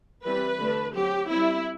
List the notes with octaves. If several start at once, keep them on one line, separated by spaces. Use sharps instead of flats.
E3 G3 C4 B4
D3 A3 D4
F#3 C4 G4
G3 C4 E4